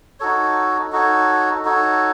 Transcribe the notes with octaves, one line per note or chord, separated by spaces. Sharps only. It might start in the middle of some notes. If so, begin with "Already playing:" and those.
D#4 F#4 A4 C#5
D#4 F#4 A4 C#5
D#4 F#4 A4 C#5